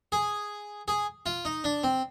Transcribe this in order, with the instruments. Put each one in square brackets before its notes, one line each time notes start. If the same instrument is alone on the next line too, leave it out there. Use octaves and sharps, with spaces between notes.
[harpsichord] G#4
G#4
F4
D#4
D4
C4